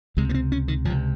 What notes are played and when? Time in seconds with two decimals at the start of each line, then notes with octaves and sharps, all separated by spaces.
0.17 C#2 C3 G#3
0.29 A#3
0.34 C4
0.52 C#4
0.68 D#3
0.85 C#2 F3
0.90 C3